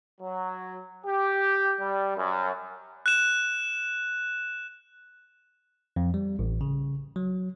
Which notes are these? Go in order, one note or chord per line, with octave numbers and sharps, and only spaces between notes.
F#3
G4
G3
F#2
F#6 E7
F2
G3
A1
C#3
F#3